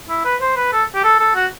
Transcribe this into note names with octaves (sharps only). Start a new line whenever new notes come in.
E4
B4
C5
B4
A4
G4
A4
A4
F#4